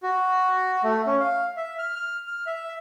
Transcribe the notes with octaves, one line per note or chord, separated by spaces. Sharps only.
F#4
A3
C#4
F5
E5
F6
F6
F6
E5